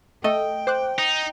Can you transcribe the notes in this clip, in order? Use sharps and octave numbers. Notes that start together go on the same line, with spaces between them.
A3 A4 D#5 G5
C5 D6 F#6
D#4